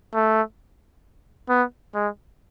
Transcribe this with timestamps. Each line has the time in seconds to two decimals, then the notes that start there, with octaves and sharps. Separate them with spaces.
0.15 A3
1.49 B3
1.94 G#3